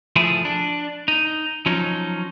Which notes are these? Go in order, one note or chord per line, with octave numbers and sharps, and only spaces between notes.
F3 A3 E4 G#4
D4
D#4
F3 F#3 C#4 D#4